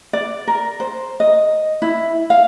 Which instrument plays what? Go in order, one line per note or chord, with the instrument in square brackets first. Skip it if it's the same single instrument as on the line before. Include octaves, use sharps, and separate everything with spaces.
[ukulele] D5
A#4
C5
D#5
E4
F5